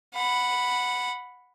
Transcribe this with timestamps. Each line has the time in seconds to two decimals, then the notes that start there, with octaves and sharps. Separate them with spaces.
0.15 F#5 B5